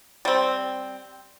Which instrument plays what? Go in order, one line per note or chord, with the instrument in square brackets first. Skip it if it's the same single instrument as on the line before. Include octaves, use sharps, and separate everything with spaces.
[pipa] G3 C4